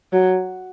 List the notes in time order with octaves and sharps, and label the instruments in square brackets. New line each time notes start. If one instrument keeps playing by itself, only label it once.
[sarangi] F#3